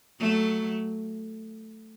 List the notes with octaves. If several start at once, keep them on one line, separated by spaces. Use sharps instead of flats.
F#3 A3